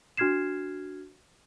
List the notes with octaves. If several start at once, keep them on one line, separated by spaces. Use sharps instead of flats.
D4 F#4 F6 G#6 C7 E7